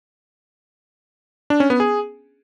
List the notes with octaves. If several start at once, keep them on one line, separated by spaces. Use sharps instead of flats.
D4
C#4
B3
G#4